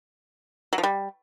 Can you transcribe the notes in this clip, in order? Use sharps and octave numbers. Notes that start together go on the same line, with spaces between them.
F#3
F3
G3